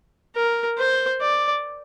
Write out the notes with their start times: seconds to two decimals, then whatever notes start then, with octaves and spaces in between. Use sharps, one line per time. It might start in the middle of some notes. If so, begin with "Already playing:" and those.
0.35 A#4
0.79 C5
1.20 D5